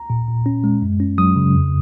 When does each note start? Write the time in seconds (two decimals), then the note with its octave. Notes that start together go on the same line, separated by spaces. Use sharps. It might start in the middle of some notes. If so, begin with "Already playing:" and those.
Already playing: A#5
0.10 A#2
0.28 A#2
0.46 C#4
0.64 G#3
0.82 F#2
1.00 C#4
1.18 F#3 D#6
1.36 C#3
1.54 F2